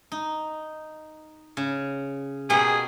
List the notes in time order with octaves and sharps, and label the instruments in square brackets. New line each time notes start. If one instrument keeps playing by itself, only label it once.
[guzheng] D#4
C#3
[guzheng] B2 A#3 G4 [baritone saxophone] G#4